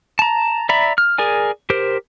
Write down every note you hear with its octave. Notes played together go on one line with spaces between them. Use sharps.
A5 A#5
D5 E5 A#5 B5
F6
G#4 A#4 D5 G#5
G4 A#4 C5